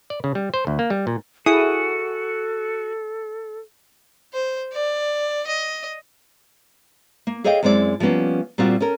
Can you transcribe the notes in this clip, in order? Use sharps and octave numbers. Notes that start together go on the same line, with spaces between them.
D5
C#3
G3
C5
D2
A#3
G3
A#2
E4 F#4 G#4 A4 D#6
C5
D5
D#5
A#3
G#4 A4 C#5 D#5 F5 G5
F#2 G#3 C4 E4 D5
F3 G3 A#3 B3 C#4
A#2 G3 C4 F4 F#4
C#4 A4 A#4